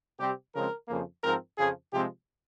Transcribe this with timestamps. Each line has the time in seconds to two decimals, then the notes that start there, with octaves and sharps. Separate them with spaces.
0.19 C3 G3 C4 G4
0.54 C#3 F3 G#3 C4 A#4
0.88 F2 C#3 F3 A#3
1.23 G#2 F3 C4 A#4
1.58 F2 C#3 F3 G#4
1.92 C3 F3 G#3 C4 G4